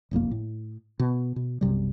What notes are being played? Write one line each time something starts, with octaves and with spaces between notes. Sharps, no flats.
F#1 B1 F2 A#3
A2
B2
B2
B1 F#2 C3 G3